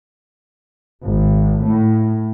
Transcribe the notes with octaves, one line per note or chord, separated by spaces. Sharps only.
G#1
A2